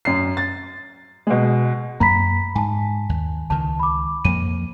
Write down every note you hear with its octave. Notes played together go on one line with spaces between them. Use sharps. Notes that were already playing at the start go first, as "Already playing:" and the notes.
F#2 C7
A6
B2 G#3
F#2 A#3 A#5 B5 B6
G#2 G#5 A5
D#2
C#2 D#3 A5
B5 D6
F2 A#3 D#7